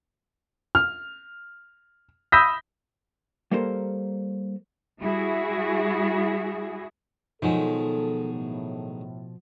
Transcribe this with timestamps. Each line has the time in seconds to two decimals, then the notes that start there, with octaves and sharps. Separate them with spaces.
0.75 F6
2.32 B5 D#6 E6 G6 A#6 B6
3.51 G3 A#3 A4 A#4 C5
5.02 G3 E4 F#4 G#4
7.42 B2 D#3 F3 F#3 G#3 A4
8.34 A2